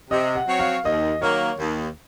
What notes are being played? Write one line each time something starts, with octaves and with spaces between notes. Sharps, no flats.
C3 D#5
F#5
F#3 C4 F#4 C#5
F5
D#2 D#5
D#3 F#3 A#3 C#5
D#2